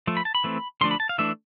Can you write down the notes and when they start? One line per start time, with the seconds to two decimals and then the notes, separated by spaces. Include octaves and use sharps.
0.07 F3 A3
0.17 B5
0.25 A5
0.35 B5
0.44 E3 A3 C4
0.81 D3 F3 A3 D4 C6
0.91 B5
1.00 A5
1.09 F5
1.18 E3 A3 D4 E5